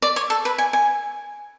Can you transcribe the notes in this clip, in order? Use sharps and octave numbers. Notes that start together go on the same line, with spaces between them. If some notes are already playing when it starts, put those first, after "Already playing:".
D5
C#5
A4
B4
G#5
G#5